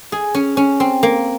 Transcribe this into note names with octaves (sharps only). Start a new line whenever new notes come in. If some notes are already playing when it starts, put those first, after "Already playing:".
G#4
C#4
C#4
C4
A#3